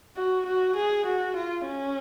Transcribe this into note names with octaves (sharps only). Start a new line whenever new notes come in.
F#4
F#4
G#4
F#4
F4
C#4